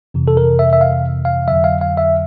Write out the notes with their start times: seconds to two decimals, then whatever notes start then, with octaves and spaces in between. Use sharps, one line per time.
0.14 F2 C3 E3
0.28 A4
0.37 A#4
0.59 E5
0.73 E5
0.81 F5
1.25 F5
1.48 F2 D3 F#3 E5
1.64 F5
1.81 F5
1.97 E5